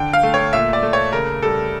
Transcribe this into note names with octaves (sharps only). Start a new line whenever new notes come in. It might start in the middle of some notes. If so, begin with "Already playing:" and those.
Already playing: D3 G5
F5
A3
C#5
A#2 E5
D5
A3
C#5
C#3 A#4
G3 A4